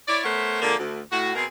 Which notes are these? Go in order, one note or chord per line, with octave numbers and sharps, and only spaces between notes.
E4 C#5 D5
A3 B3 A#4 C5 C#5
D3 F3 G#3 A#3
D2
A2 F#4
B2 C4 G#4 A#4